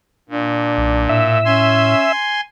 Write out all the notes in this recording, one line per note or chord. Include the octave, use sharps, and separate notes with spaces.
A#2 D4
B1
A2 E5
C#4 G#5 C6